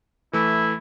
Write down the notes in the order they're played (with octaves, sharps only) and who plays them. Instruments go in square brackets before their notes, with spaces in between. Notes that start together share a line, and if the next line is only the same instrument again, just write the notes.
[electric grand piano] E3 A3 [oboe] E4